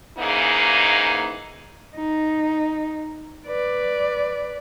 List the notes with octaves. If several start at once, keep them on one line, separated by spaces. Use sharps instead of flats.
G#2 C#3 E3 A#3 D#4 G#4
D#4
B4 D5